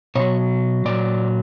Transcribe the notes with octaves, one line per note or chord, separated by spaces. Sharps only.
B2 F#3 C#5
A#2 F#3 D5